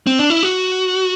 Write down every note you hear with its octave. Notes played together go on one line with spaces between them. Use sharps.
C4
D4
E4
F#4